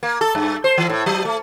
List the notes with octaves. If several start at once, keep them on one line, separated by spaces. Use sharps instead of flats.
A#3
A4
G2
C5
E3
A2
F#3
A3